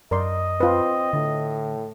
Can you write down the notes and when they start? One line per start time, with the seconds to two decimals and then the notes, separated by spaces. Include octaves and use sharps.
0.11 F#2 A#4 D5 D#5 C6
0.60 C4 F4 B4
1.13 A2 D3